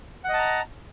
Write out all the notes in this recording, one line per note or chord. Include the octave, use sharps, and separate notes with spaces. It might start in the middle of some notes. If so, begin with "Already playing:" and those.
D#5 F#5 A5 A#5